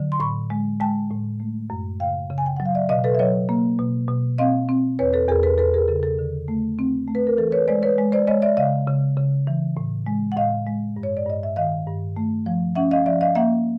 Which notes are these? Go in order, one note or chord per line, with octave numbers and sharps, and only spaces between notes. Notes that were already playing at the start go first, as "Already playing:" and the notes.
Already playing: D3 F#3
C6
A2 B5 C#6
G#3
G#3 G5 A5
A2
A3
F#2
C#3 F5 G5
C#3
G#5
G5
F#3 F#5
F5
D5 E5
B2 D#5 F5
A4 B4
E5
F#3 C#5 D#5
A#3
B2
B2
C4 D#5 F5
C4
E2 B4 C#5
A4 B4
E2 G#4 A#4
A4 B4
E2 A4 B4
G#4 A#4
C#3 A4
A4
D3
A3
C4
A3
B4
A#4
E3 A4
B4 C#5
G#3 C5 D5
B4 C#5
G#3
C5 D5
G#3 C#5 D#5
D5 E5
C#3 D#5 F5
C#3
C#3
E3
A2
G#3
F#5
A2 D#5 F5
G#3
G2
C#5
D5
G2 D#5
E5
D#3 D#5 F5
G2
A3
F3
C#4 E5 F#5
D#5 F5
F3 D5 E5
D#5 F5
A#3 E5 F#5